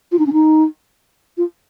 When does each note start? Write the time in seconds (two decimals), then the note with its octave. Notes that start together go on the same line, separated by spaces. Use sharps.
0.12 F4
0.19 D#4
0.26 C#4
0.33 D#4
1.38 F4